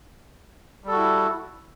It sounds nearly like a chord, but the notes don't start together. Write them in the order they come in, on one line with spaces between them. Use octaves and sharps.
G3 A4 F#4 E4